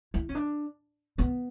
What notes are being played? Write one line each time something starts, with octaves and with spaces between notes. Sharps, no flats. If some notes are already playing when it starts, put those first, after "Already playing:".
E4
C#4
D4
B3